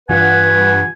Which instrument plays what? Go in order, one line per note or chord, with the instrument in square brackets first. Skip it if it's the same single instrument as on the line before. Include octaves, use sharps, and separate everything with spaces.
[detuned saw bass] G2 [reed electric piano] E3 F4 [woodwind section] B4 F#5 [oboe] G#5